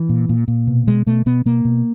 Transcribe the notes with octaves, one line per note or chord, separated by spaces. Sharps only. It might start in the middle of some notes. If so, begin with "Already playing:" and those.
Already playing: E3
A#2
A#2
A#2
B2
B2 G#3
B2 A3
B2 B3
B2 A#3
B2